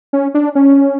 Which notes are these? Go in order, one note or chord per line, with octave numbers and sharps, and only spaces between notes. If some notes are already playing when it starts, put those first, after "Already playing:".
C#4
D4
C#4